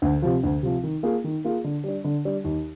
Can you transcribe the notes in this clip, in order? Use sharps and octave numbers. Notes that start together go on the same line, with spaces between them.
D2
C3 F3
D2
C3 F3
D#3
A#3 F4 G#4
D#3
A#3 F4 G#4
D3
G3 D4
D3
G3 D4
D#2